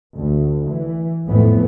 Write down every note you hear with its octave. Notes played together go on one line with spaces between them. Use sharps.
D2
E3
G#1 F2 A2 E3 A3 B3